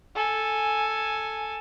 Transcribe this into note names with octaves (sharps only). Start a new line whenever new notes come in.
A4 G#5